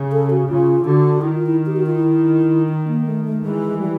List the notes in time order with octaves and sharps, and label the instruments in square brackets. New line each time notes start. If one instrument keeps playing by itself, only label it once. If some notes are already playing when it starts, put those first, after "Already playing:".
Already playing: [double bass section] C#3
[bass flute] A4
F#4
[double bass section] C#3 [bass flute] F4
[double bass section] D3 [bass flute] F#4
[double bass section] D#3 [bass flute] E4
[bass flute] F4
E4
G4
F#4
F4
E4
D#4
A#3
A3
A3
[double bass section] E3 [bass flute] G#3
[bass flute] G3